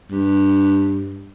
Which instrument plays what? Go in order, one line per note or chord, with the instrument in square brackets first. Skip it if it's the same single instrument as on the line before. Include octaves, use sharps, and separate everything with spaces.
[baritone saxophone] G2